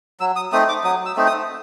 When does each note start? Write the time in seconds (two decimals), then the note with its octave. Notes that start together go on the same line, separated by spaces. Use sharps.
0.20 F#3 E6
0.36 D#6
0.52 A3 C4 D#4 D#6
0.69 D6
0.84 F#3 D#6
1.06 E6
1.16 A3 C4 D#4
1.27 D#6